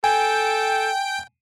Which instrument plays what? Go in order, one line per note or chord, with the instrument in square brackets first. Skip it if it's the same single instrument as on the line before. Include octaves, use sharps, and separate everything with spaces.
[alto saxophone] A4 [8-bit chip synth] G5 [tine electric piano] G#5